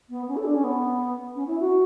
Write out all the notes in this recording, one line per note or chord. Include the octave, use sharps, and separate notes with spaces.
B3
C#4
A4
D4
C#4
B3
C#4
E4
F#4